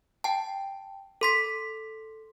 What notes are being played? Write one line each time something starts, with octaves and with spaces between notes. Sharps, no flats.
G5 A5
A4 C6 B6